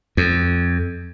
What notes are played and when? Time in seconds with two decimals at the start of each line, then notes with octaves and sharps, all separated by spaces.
0.17 F2